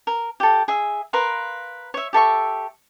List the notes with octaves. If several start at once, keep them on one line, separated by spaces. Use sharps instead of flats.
A#4
G4 A4
G#4 E5
A#4 B4 F5 C6
C#5 E5
G4 A4 E5 C#6